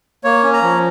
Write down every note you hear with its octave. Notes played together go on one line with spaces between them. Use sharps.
A#3 C#5
C#4
A#5
F3